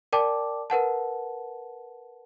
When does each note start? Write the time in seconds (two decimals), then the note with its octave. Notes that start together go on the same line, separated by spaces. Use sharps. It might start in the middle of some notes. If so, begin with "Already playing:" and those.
0.13 A#4 D5 G5 A5 D6
0.70 A#4 B4 F#5 A5